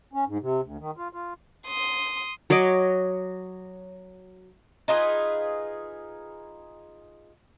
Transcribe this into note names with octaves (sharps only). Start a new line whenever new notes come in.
C#4
G#2
C3
D2
D#3
F4
F4
C6 D#6
F#3 C#5 D#5 D6
D#4 F4 G#4 B4